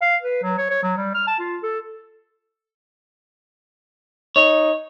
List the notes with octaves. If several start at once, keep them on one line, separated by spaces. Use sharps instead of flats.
F5
B4
F#3
C#5
C#5
F#3
G3
F6
A5
F4
A4
D#4 C#5